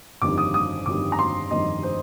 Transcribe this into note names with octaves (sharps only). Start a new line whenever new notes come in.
G1 F2 D#3 G3 D6
D#6
D#6
G1 F2 D#3 G3 D6
A#5
C6
G1 F2 D#3 G3 D#5
C5